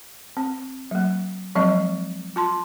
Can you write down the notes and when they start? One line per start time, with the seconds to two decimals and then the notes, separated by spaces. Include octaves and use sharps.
0.37 C4
0.91 F#3 A#3
1.55 F3 F#3 G#3 C4 D#5
2.36 F4 A5 C6